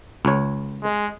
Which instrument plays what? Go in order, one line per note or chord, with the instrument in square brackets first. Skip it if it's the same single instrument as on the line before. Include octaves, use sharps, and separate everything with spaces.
[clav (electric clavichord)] C#2 C#5
[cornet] G#3